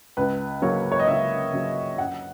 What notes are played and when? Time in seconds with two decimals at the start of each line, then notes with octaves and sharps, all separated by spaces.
0.17 C#2 B4
0.62 C#3 F#3 A#3 C#4 C#5
0.92 C#5
0.99 D#5
1.08 C#2 E5
1.53 C#3 F#3 A#3 C#4
1.98 F#2 F#5